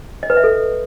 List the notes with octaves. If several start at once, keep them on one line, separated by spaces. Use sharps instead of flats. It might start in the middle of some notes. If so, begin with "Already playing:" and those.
D#5
B4
E5
A4